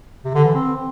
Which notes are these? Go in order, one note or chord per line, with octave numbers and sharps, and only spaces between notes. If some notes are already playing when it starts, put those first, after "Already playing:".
C3
D3
E3
C4